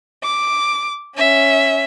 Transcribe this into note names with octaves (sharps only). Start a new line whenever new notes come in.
D6
C#4 E5